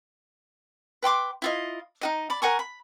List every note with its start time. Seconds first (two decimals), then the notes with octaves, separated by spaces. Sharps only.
1.03 B4 G5 C6 D6
1.42 E4 F4 D#5
2.01 D#4 F#4 D#5
2.30 D5 B5
2.42 A#4 F#5 G#5 C#6
2.59 B5